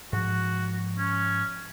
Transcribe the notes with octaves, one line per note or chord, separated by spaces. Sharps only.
G#2 F3 F#4
C#4